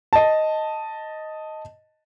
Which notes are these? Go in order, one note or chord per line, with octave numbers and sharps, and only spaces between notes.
D#5 A5